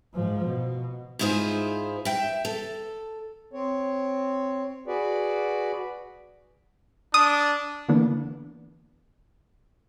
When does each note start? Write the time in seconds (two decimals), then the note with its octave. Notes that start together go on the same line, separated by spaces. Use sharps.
0.14 G#2 F3
0.45 B2
1.19 G#2 E4 F4 G#4 C5
2.05 E5 G5
2.45 A4
3.53 C4 C#5
4.87 F#4 G#4 B4 D5
7.14 D4 D#6
7.89 D3 E3 A#3 B3 D4